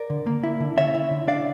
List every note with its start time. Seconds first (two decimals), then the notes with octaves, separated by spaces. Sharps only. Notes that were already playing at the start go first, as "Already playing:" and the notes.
Already playing: A#4 D5
0.10 D3
0.27 A#3
0.43 E4
0.60 D3
0.77 C#4 C#5 E5
0.94 E4
1.11 D3
1.28 D4 D5 F5